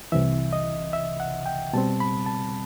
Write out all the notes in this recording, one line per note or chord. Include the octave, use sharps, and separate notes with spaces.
C2 C3 E3 E5
D#5
E5
F#5
G5
B2 G3 C4 A5
B5
A5